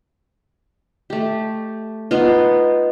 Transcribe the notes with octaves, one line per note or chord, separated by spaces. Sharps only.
A3 G4
B3 D#4 F4